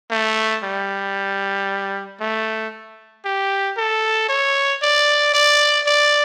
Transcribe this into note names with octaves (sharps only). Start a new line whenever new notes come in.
A3
G3
A3
G4
A4
C#5
D5
D5
D5